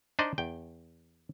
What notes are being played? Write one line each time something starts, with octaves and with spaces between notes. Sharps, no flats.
D4 D#4 C5 D5 D#5
E2 G5